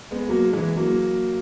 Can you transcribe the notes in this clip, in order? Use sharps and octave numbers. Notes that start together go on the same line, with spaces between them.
G#3 B3
F#3 A#3
E3 G#3
F#3 A#3